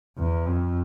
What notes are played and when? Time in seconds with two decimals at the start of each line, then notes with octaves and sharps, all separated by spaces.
0.18 E2
0.46 F2